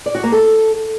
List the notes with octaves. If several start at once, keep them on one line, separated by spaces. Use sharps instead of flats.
D5
F#4
A#3
A4